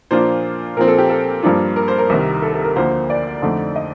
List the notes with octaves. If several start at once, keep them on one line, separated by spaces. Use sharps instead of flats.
A#2 F3 A#3 D4 F4 C5
A#2 F3 C4 A#4
A4
G4
A4
G2 F3 A#3 D4 F4
A#4
C5
A#4
C2 C3 D#3
A4
A4
A#4
D2 D3 F3 A#3 C5
D5
F2 D3 A3 D#4
D#5